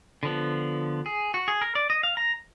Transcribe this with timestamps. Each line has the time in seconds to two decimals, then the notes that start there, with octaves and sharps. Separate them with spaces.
0.23 D3 F3 B3
1.06 G#4
1.34 F#4
1.48 G#4
1.61 A#4
1.75 D5
1.90 D#5
2.03 F5
2.17 A#5